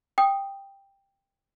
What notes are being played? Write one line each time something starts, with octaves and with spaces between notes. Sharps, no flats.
G5 D#6